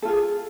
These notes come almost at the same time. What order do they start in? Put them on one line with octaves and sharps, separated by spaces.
A4 F4 G#4